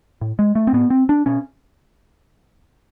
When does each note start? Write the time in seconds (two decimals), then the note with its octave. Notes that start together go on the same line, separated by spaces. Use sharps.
0.21 A2
0.39 G#3
0.55 A3
0.67 C4
0.73 A2 B3
0.90 C4
1.09 D4
1.26 B2 C#4